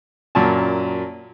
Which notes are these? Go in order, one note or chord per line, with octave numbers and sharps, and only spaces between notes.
F#2 A#2 A5